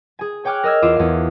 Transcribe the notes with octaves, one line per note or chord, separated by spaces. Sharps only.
G#4 G#5
C#5 G5 G#5 D6 F6 F#6
A#4 D#5 E6 F6 G#6
E2 F4 D6 D#7 E7
E2 F5